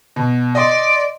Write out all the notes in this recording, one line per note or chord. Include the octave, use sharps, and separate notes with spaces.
B2
D5 D#5 C6